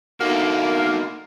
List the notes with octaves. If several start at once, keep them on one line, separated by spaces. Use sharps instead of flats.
D3 A3 A#3 D#4 F#4